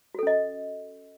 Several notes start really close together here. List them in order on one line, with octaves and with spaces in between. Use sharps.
F#4 A4 C#4 D#5